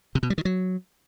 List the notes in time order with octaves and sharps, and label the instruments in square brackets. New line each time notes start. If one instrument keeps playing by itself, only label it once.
[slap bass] C3
B2
G3
D#3
F#3